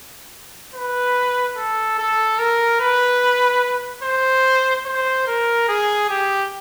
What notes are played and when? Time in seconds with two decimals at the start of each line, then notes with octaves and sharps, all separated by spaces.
0.75 B4
1.57 A4
1.98 A4
2.39 A#4
2.80 B4
4.03 C5
4.86 C5
5.27 A#4
5.68 G#4
6.10 G4